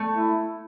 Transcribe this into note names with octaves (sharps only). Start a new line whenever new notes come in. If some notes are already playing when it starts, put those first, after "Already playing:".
Already playing: A3
E4